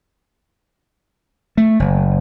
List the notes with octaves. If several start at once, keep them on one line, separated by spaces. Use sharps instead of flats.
A3
F#1